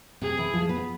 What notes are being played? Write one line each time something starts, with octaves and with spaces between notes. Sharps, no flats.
C3 C4 G#4
E3 E4
F3 F4
B3 B4